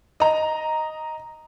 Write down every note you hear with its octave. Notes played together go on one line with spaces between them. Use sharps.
D#5 A#5